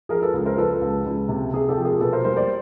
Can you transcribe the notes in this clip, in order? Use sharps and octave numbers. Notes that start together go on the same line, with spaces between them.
F3 G#4 A#4
A4 B4
C#2
A#4 C5
F3 A4 B4
C#2
C#2
C3
C3 G#4
G4 A4
F3
G#4 A#4
B2 A4 B4
A#4 C5
G3 A#4 C5
C5 D5